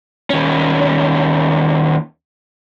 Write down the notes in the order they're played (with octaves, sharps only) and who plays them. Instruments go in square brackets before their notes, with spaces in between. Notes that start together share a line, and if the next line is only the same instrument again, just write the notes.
[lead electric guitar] D#2 C#4